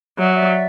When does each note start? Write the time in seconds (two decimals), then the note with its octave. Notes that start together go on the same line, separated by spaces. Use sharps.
0.18 F#3 D5 E5
0.34 D5 E5